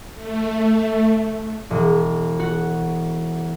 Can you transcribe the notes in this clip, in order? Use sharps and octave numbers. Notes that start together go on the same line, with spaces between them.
A3
E1
F#4